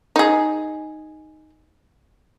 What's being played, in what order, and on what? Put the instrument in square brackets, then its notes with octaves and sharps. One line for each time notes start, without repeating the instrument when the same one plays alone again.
[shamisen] D#4 G#4